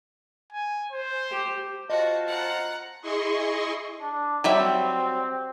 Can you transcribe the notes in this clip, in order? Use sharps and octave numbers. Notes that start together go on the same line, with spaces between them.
G#5
C5
G4
F4 F#4 C5 D#5 A5
F#5 A#5
E4 G#4 D#5 C6 C#6
D4
F#3 G3 C4 E5